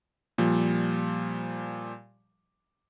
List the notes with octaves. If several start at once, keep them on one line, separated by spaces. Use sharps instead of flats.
A#2 F3 G3